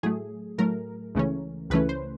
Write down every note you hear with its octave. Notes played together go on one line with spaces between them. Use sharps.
A2 F#3 A3 G#4
A2 F#3 A3 A#4
C#2 C#3 E3 A3 C#4
C#2 C#3 E3 A3 C#4 B4
C5